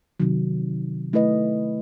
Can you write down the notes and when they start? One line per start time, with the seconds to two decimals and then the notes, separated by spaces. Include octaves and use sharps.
0.20 C3 D#3 F#3
1.13 A3 E4 B4 D#5